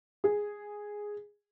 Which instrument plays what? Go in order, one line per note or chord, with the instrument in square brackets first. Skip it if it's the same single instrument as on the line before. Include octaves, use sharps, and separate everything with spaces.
[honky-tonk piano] G#4